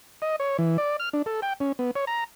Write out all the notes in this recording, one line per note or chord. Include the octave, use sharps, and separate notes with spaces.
D#5
C#5
E3
D5
F6
D4
A4
G5
C#4
B3
C#5
A#5